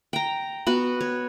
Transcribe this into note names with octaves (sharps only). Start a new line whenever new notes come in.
G5 A#5
B3 F#4
C#5